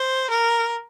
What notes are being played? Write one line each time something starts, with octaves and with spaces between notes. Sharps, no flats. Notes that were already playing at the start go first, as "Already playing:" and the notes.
Already playing: C5
A#4